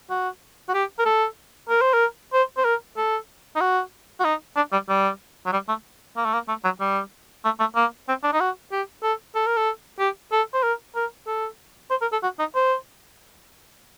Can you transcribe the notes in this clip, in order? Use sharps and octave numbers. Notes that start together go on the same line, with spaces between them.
F#4
F#4
G4
A#4
A4
A#4
C5
A#4
C5
C5
A#4
A4
D#4
F#4
F#4
D#4
D4
G3
G3
F#3
G3
A3
A#3
A3
A#3
A3
F#3
G3
A3
A3
A#3
C4
D4
D#4
F#4
G4
A4
A4
A#4
A4
G4
A4
C5
A#4
A#4
A4
C5
A#4
A4
F#4
D#4
C5